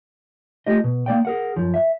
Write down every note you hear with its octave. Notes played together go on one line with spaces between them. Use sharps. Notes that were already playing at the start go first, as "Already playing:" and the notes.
A3 F4 G4 D#5
B2
A#3 D5 G5
G#4 A#4 F#5
F#2 F3
E5